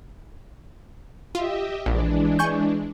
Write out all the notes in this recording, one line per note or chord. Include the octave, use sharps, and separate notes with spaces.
F4 G4 D#5 E5
A#1 E3 G#3 D4
G#5 C#6 G6